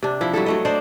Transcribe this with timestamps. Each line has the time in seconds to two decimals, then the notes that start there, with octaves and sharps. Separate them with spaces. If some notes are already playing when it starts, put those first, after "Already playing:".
0.03 C3 D4
0.21 F3 E4
0.33 F#3 G3 E4 A4
0.46 F#3 A3 D#5
0.65 D4 C5 D5 D#5